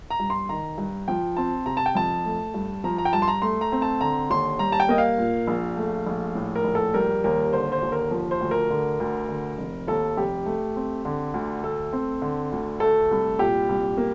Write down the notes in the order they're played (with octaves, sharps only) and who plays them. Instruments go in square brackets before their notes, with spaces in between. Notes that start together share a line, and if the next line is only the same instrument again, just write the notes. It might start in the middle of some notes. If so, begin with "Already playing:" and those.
[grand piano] A#5
G2
C6
D#3 A#5
G2
F3 G5
C4 A5
C3 A#5
A5
G5
F2 A5
A3
G2
F3 A#5
A#5
G5
G2 A5
C6
A#5
A3 C6
A#5
C4
A5
D3 A#5
D#2 C6
G3 A#5
A5
G5
A#3 D#5
F5
A#2
A#1
A3
A#1
A2
A#4
A#1
A4
G3 A#4
D#2 A#4
D3 C5
C5
D#2
A#4
F3
C5
D2
A#4
D3
D2
D3
F1
D#2 A4
F1 G4
A3
C4
D3
D2
A3 A4
C4
D3
D2
A3 A4
C2
A#2 G4
C2
A#3